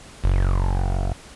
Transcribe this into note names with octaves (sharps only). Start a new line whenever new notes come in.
F#1